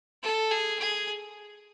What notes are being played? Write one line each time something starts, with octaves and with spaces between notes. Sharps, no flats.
A4
G#4
G#4